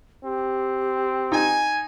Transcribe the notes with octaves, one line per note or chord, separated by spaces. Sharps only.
C4 G4
D#4 G#5